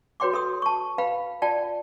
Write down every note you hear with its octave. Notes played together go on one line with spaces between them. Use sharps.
F#4 B4 C#5 G5 C6 D6
A4 C6 D#6
A5 C#6
B4 F5 G5 B5
F4 D5 G5 A5